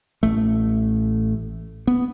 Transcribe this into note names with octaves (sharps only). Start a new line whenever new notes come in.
A1 A3
B3